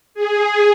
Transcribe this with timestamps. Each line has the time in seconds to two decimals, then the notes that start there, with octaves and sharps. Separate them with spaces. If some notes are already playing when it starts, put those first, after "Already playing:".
0.14 G#4